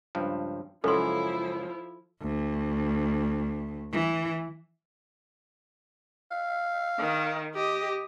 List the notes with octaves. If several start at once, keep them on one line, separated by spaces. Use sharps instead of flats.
C#2 G2 F3
C#2 F#2 F3 C#4 E4 A4 C6
D2
E3
F5
D#3
G4 D#5